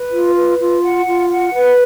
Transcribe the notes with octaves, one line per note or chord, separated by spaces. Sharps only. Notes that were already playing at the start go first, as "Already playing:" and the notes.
Already playing: B4
F4
B4
F4
F#5
F4
F#5
B4